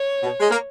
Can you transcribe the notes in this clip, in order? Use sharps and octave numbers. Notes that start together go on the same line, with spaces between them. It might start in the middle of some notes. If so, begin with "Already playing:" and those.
Already playing: C#5
B2
G#3
A#3